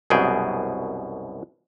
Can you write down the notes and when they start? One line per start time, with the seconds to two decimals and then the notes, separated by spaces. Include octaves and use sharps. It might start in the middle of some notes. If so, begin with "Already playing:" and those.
0.10 C2 F#2 B2 G#4 G5